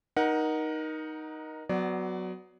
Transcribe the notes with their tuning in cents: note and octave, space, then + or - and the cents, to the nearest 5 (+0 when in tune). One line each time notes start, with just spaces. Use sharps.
D#4 +0 A#4 +25 F#5 +0
F#3 +0 B3 +25 D5 +0